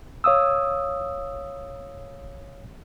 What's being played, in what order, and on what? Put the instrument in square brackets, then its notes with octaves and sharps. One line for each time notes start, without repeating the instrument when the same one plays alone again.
[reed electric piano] C#5 F5 D#6 E6